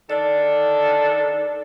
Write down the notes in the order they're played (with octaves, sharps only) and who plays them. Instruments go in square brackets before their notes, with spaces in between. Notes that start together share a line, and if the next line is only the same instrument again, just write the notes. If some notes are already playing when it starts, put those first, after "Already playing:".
[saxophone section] D#3 D4 A4 [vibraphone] D5